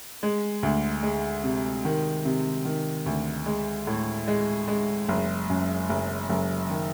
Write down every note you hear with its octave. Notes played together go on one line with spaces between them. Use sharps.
G#3
D2
G#3
C3
D#3
C3
D#3
D2
G#3
A2
G#3
G#3
F#1
F#2
F#1
F#1
D#3